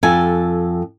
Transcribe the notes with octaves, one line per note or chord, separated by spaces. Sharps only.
F2 A4 G#5